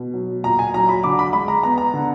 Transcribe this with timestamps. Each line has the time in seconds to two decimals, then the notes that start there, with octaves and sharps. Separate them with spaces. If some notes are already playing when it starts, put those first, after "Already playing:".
Already playing: B2
0.14 F#3
0.44 A#2 A#5
0.59 G#5
0.74 F#3 A#5
0.89 B5
1.03 D3 D6
1.19 B5
1.33 G#3 B5
1.48 A#5
1.63 B3 A#5
1.78 A#5
1.94 D3